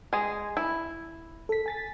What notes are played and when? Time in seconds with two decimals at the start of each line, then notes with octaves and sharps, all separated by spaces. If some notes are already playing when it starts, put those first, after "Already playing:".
0.13 G#3 G#4
0.57 E4
1.49 A4 B6
1.66 G#5 A6 B6